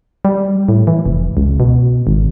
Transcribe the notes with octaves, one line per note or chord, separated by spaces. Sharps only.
G3
A2
E3
F1
C#2
B2
G#1